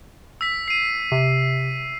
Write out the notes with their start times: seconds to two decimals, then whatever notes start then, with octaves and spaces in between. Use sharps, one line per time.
0.41 E6 B6
0.68 C7 D#7
1.12 C3